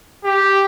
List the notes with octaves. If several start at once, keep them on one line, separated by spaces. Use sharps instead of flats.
G4